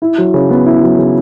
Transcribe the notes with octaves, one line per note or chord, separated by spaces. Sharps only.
E4
F#3
C#3
B3
E4
F#3
C#3